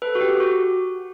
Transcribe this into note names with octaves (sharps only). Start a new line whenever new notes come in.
A4 B4
F#4
G4
F#4